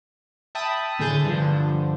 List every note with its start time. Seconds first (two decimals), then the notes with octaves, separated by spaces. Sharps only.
0.55 E5 G5 A5 B5 D#6
0.99 A2 D3 A3 G#4 G6 A6
1.25 G2 D3 F3